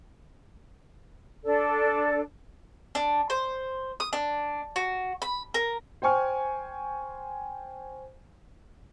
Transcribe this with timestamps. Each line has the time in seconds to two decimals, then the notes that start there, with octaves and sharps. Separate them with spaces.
1.45 D4 A4 D5
2.95 D4
3.30 C5
4.00 D#6
4.13 D4
4.76 F#4
5.22 B5
5.54 A#4
6.02 C5 G5 G#5 C#6 F6